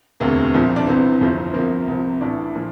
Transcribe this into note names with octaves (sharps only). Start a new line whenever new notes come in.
E1 D2 C3 A#3
C2 A#2 F3
D4
C2 C3 E3 C4
G1 F2 C3 F3
C2 C3 F3 A#3
C2 C3 F3
A1 A2 E3 D4
A#2 F3